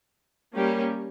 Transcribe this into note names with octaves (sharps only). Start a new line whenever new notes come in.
G3 A#3 C#4 G4